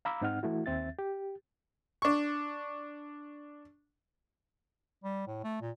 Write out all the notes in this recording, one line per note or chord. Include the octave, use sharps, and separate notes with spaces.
F5 A#5 B5 D6 E6
G#2 C4 D#4 F#5 F6
E3 A3 E4 F#4
D#2 C4 E5 A6
G4
D4 C#6
G3
A2
A3
A#2